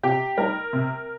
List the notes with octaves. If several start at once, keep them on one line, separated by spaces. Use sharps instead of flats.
C3 G4
G3 D#4 A#4
C3